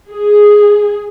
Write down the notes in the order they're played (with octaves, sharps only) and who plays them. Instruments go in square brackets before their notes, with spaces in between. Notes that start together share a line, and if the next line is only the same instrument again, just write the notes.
[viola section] G#4